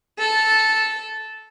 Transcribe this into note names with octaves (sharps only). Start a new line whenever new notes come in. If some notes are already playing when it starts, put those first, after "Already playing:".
A4